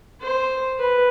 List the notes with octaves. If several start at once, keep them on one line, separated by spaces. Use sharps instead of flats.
C5
B4